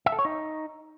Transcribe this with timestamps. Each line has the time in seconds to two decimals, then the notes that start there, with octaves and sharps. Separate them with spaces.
0.06 E5
0.12 A4
0.19 C#5
0.25 D#4